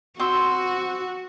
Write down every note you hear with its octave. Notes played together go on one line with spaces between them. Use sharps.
C4 F#4 C6 E6